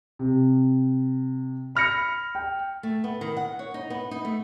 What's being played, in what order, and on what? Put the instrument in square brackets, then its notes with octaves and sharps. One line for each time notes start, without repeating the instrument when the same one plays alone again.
[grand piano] C3
B5 F6 A#6 C#7
G5
[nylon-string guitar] A3
B3
D#3
F#5
C#5
D#4
B3
D#4
A3